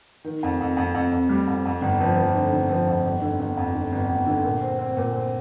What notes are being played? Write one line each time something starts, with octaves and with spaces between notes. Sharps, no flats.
D#3
F2
F2
F2
F2
F2
G3
F2
F2
G1
F3
F3
D3
D3
F3
F2
G1
D3
G1
F2
D3
G1
G1
D3
A#2
C4
C4
A#2
C4